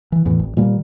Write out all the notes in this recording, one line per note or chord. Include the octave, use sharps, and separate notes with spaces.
E3
E2 A2 E3
G#1
A#2 D#3 G3 A#3